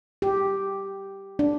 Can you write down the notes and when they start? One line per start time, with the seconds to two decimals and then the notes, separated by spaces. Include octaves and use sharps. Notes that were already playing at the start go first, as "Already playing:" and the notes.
0.22 G4
1.39 D4